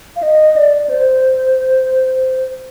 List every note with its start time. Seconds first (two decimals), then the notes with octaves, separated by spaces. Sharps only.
0.16 F5
0.23 D#5
0.56 D5
0.89 C5